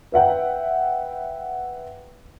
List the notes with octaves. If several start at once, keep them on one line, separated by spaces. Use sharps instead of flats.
B4 E5 F#5 G5